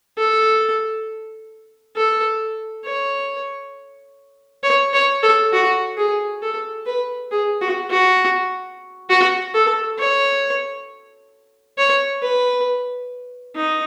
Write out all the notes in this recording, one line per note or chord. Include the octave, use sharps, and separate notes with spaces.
A4
A4
C#5
C#5
C#5
A4
F#4
G#4
A4
B4
G#4
F#4
F#4
F#4
A4
C#5
C#5
B4
D#4